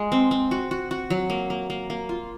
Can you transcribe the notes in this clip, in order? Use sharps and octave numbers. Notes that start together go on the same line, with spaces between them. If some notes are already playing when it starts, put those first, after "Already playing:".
Already playing: G#3
C4
C4
F#4
F#4
F#4
F#3
A#3
A#3
A#3
A#3
F4